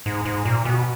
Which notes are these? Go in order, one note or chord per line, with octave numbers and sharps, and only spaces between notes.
G#2
G#2
A#2
B2